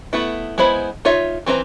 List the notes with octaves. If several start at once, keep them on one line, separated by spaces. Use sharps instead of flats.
A3 B3 E4
G#3 B3 E4 C5 B5
D#4 F4 C#5 E5
E3 C4 B4 A#5